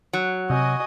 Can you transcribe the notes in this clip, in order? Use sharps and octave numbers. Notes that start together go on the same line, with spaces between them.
F#3
C3 F#4 D#5 G#5